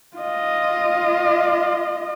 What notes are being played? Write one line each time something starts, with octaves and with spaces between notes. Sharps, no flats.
F4 D#5